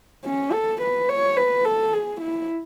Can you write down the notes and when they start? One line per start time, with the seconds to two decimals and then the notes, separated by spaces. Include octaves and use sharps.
0.25 C#4
0.52 A4
0.81 B4
1.09 C#5
1.37 B4
1.65 A4
1.93 G#4
2.21 E4